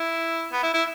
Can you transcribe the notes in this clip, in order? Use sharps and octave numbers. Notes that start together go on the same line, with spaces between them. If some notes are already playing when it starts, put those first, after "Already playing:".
Already playing: E4
B3
E4
E4